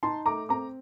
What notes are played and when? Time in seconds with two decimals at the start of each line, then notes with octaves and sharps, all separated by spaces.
0.03 D#4 A5 C6
0.26 A3 A#5 D6
0.49 C4 A#5 D6